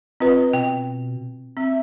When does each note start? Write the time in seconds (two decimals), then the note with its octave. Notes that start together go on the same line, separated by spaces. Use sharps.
0.20 C4 F4 B4 D#5
0.53 B2 G5
1.57 C4 E5